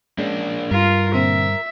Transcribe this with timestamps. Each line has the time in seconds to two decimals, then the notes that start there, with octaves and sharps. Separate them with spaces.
0.18 G#3 A#3 C#4 D4
0.71 G2 F4 A#4
1.14 A#2 D3 C4 E5